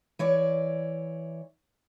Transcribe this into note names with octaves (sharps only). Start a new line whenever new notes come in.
E3 C#5 D5